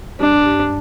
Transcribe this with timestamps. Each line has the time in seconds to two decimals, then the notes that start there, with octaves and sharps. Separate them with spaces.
0.20 G2 D4
0.46 G2